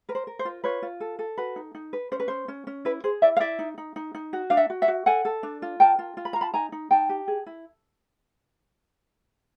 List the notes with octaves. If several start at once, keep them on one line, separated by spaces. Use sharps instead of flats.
A#4 B4
C5
A#4
C5
F4
F4 B4 C#5
F4
A4
A4
F#4 B4
D#4
D#4
B4
C#4 C5
B4
C#4 C5
C#4
C#4
E4 B4
G#4 C5
E4 D5 E5
F5
E4 D5 E5
D#4
D#4
D#4
D#4
F#4
D4 F5
E5 F#5
F#4
E5 F#5
F#4
A4 F#5 G#5
A4
D4
F4
A#4 G5 A5
F4
F4
B5
F4 A#5
A5 B5
D#4 G#5 A#5
D#4
D#4 G5 A5
G4
G#4
E4